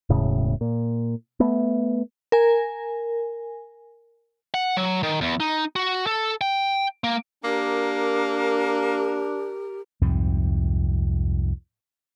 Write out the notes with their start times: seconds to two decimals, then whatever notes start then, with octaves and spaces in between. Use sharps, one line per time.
0.09 E1 A2 C#3
0.61 A#2
1.40 A3 B3
2.32 A#4 G#5
4.54 F#5
4.77 F#3
5.03 D#3
5.21 E2
5.40 D#4
5.76 F#4
6.07 A4
6.41 G5
7.04 A#3
7.44 A#3 D4 G4 A#4
10.01 C2 F2 G#2 C3